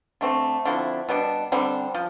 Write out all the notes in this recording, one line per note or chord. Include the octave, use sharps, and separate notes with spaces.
D3 A3 C4
D3 F3 C4 E4
B2 G3 D4
D3 G3 C4
F3